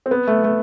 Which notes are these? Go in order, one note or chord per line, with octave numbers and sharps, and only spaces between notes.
C4
B3
A3
A3